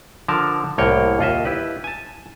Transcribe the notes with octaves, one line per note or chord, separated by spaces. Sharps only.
D3 F3 A#4 A5
C2 A2 A#3 C#5 G5
D#2 F4 D#5 E5
E4 G4 B4
G#5 A5